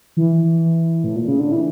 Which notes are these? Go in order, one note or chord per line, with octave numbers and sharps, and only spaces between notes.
E3
A2
A#2
C#3
D3
E3